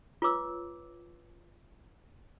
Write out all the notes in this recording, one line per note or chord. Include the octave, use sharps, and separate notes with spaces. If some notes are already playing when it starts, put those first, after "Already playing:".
F4 B4 C#5 D6 E6